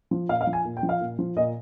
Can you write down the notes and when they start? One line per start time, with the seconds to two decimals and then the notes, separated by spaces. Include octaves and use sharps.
0.11 F3
0.29 A#2 F5
0.41 F5
0.47 F3
0.53 G#5
0.65 A#2
0.77 G5
0.83 F3
0.89 F5
1.01 A#2
1.19 F3
1.36 A#2 D#5